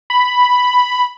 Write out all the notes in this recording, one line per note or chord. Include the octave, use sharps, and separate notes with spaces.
B5